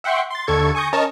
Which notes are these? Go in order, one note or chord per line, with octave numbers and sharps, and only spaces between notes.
E5 F#5 G5 C6 C#6
C6 A6
D#2 D3 A4 C#6 G#6
G#5 C#6 D#6 G6 A#6
C#4 A#4 C#5 D#5 A5